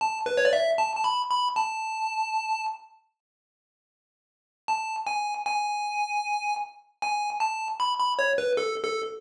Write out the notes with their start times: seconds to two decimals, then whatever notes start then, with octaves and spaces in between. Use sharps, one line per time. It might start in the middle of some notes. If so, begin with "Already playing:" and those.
0.01 A5
0.26 B4
0.37 C#5
0.45 D5
0.53 E5
0.78 A5
0.96 A5
1.04 B5
1.30 B5
1.56 A5
4.68 A5
5.07 G#5
5.46 G#5
7.02 G#5
7.40 A5
7.80 B5
7.99 B5
8.19 C#5
8.38 B4
8.57 A4
8.84 A4